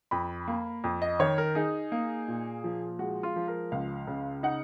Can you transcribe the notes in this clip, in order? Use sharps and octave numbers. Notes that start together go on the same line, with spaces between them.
F2 B5
A#3
F2
D#5
D#3 C#5
A#4
D#4 G#4
A#3
A#2
F3
G#3 F#4
F4
F3
A#4
C#2 F5
C#3
D#4 F#5